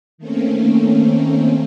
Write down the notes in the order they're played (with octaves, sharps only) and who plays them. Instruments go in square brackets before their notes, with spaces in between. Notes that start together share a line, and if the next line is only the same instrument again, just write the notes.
[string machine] D#3 A3 A#3 C4 C#4